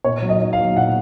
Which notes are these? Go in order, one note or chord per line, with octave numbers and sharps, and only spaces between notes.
A#2 C#5
F#3
D#5
F#3
F5
F#3
A#2 F#5